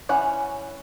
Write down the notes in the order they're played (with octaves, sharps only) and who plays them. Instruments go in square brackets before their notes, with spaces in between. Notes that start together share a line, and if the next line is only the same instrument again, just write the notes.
[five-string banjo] E3 C#4 F#5